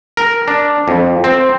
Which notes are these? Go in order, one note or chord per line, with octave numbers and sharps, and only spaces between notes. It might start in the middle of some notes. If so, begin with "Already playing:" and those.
A#4
D4
F2
C4